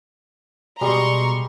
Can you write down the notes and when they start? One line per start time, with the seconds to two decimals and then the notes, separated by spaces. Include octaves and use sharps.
0.81 B2 G3 G#3 A#5 C6 C#6 D#6